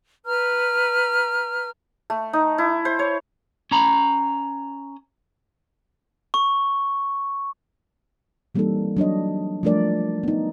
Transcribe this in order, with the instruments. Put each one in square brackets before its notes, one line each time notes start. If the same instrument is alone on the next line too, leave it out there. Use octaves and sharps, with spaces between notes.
[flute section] B4 A#5 F6
[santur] A3
D#4
E4
C5
C#5
[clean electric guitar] C#4 A#5 B5
[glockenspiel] C#6
[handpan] E3 G3 A#3 C4 D#4 A4
F#3 D4 C#5 D#5
F3 G3 A3 D4 A#4 D5
B3 D#4